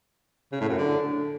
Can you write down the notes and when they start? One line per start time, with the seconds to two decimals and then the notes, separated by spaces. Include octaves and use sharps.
0.52 C#3
0.61 A2
0.69 F#2
0.78 D3